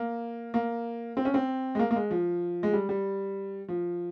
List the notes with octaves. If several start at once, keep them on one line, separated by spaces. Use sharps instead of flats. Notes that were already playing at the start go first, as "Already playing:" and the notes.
Already playing: A#3
A#3
C4
C#4
C4
G#3
A#3
A#3
G#3
F3
G#3
G3
G3
F3